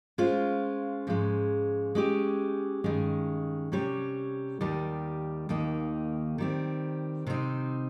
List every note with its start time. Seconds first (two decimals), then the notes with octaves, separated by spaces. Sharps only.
0.18 G#3 C#4 F4 C5
1.07 G#2 F3 G#3 C#4
1.95 G#3 C#4 G4
2.84 G2 D#3 G#3 C#4
3.72 C3 G3 C#4 G4 C#5
4.61 D#2 D#3 G3
5.49 D#2 D#3 A#3 D#4
6.38 D#3 G3 C4
7.26 C3 G3 C4 D#4